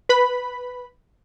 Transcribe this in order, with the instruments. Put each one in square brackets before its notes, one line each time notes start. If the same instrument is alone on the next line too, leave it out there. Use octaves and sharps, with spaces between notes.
[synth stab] B4 B5